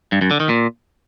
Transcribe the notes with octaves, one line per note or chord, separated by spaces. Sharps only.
G2
F#2
D3
D#3
A#2